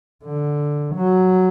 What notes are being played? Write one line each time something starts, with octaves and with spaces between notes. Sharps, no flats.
D3
F#3